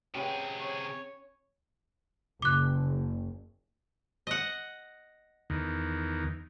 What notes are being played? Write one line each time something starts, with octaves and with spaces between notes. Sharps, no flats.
C3 C#4 G4 G#4 B4 F#5
C#5
F#1 D6 F#6
D#5 F#5
E2 D#3